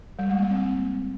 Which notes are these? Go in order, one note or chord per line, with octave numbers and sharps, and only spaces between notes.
G3
G#3
A#3
C4